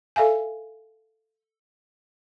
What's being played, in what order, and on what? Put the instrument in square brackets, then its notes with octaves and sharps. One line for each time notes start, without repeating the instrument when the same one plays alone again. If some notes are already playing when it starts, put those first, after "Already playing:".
[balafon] A4 E5 F5 G#5